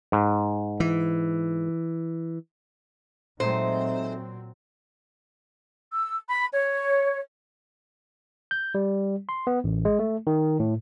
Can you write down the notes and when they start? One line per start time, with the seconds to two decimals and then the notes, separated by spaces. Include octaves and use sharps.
0.12 G#2
0.80 E3
3.40 A#2 F#3 G#3 A3 C4 D#4 C5
5.93 E6
6.29 B5
6.54 C#5
8.51 G6
8.75 G3
9.29 C6
9.47 B3
9.64 A1
9.85 G#3
9.99 A3
10.27 D#3
10.60 A2